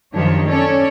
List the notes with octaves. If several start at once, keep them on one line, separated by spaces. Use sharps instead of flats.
F#2 D#3 F3 D4 G4 C#5
C#4 A4 C#5 D5